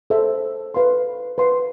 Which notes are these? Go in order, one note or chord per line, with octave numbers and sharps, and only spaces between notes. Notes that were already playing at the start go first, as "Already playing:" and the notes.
A4 C5 E5
B4 F5 C6
B4 F5 C6